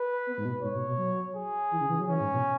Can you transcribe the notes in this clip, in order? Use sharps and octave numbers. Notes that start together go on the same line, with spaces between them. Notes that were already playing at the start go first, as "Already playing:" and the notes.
Already playing: B4
B3
G#2
B2
G#2 C#5
B2
B2
F#3
G#4
E3
C#3
E3
F#3
E3 C#4
G#2
B2